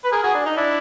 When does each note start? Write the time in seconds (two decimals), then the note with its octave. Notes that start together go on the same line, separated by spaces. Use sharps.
0.05 B4
0.12 G#4 A#4
0.23 F#4 G#4
0.34 D4
0.46 D#4
0.57 D4 E4